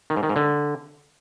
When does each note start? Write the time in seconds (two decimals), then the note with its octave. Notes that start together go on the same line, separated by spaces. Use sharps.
0.10 D#3
0.16 G#2
0.23 D#3
0.29 G#2
0.36 D3